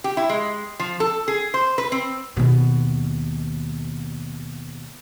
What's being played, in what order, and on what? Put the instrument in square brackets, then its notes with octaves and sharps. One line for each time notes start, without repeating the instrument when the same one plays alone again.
[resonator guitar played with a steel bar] G4
E4
G#3
F3
A4
G#4
C5
B4
C4
[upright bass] D#2 B2